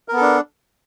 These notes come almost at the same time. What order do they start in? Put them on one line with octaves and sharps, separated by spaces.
A#4 B3 A4 D4